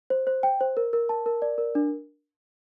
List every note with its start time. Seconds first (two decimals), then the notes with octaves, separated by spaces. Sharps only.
0.10 C5
0.27 C5
0.43 G5
0.61 C5
0.77 A#4
0.93 A#4
1.09 A5
1.26 A#4
1.42 D5
1.58 A#4
1.75 D4